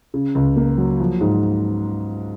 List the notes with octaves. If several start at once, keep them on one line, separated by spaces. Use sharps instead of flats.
C#3
C#2
A#3
F#3
F3
G#2